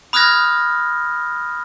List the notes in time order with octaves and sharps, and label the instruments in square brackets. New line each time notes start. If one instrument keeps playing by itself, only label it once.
[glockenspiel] B5 D#6 F6 F#6 G#6 A#6